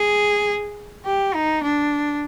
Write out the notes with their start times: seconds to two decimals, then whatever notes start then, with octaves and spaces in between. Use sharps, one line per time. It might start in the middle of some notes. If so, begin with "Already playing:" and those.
Already playing: G#4
1.06 G4
1.35 D#4
1.63 D4